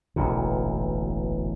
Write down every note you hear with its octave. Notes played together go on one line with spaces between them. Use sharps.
E1 A1 D2 A#2